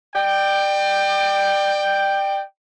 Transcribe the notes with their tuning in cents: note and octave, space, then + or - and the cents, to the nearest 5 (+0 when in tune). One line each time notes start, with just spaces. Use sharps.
D5 +30 G5 +0